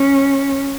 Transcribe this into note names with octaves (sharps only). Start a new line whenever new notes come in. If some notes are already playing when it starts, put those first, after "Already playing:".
Already playing: C#4